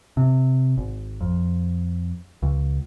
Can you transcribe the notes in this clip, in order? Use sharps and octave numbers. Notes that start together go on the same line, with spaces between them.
C3
G#1
F2
C#2